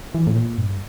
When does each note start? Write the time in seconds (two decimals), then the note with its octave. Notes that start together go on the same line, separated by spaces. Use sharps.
0.15 E3
0.27 A2
0.36 A#2
0.58 G2